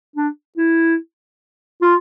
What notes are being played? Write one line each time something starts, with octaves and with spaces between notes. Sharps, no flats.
D4
E4
F4